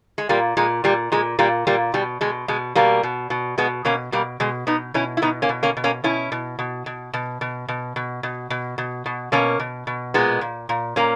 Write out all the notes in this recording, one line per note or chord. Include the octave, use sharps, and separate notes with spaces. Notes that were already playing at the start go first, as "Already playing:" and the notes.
G#3
A#2 G3 A#3
A#2 G#3
A#2 G3
A#2 G#3
A#2 G3 A#3
A#2 G3 A#3
B2 G3
B2 G#3
B2 G#3
B2 G3 A#3
B2
B2
B2 G#3 B3
B2 A#3 C#4
B2 G3 A#3
B2 G#3
B2 B3 D#4
B2 C#4 E4
E4
B2 B3 D#4
A#3 C#4
B2
A#3 C#4
B2
A#3 C#4
B2 C#4 E4
B2
B2
B2
B2
B2
B2
B2
B2
B2
B2
B2
B2 A#3 C#4
B2
B2
A#2 G#3 B3
A#2
A#2
A#2 A#3 C#4